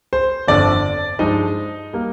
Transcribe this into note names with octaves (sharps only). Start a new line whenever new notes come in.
C5
G1 F2 D3 D5
G2 F3 G#3 D#4 D#5
G3 A#3